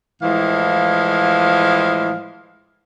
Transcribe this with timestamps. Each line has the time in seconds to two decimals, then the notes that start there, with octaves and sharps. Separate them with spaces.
0.22 A2 E3 F3 G#3 F5